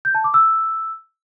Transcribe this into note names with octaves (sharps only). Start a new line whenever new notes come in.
G6
A5
D6
E6